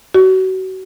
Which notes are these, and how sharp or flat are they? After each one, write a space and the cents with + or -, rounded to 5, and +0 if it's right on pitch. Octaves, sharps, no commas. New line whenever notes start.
F#4 +30